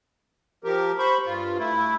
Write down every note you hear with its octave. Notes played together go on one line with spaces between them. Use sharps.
F3 G4 A#4
C5 B5 C#6
G2 F4
A3 E4